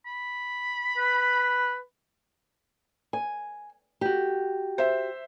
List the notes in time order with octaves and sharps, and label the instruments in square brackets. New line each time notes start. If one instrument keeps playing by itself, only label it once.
[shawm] B5
[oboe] B4
[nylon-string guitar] G#5
F#4 G4
[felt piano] C5 E5